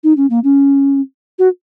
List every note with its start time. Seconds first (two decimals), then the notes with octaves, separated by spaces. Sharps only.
0.04 D#4
0.17 C#4
0.30 A#3
0.44 C#4
1.39 F#4